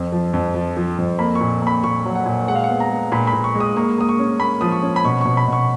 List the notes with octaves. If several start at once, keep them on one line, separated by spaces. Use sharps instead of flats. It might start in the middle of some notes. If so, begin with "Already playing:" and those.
Already playing: F2
F3
F2
F3
F3
F2
A#3 B5
C#6
A#2
A#3
B5
A#2 C#6
F#3
F#5
A#2
G#3 F#5
F5
F#5
B3
A#5
G#3
A#2 B5
B5
A#2
C#6
G#3
D#6
A#3 C#6
A#3 D#6
C#6
C#4
A#3 B5
F3 D#6
C#6
C#4
B5
B2 C#6
B2 C#6
B5
B2 C#6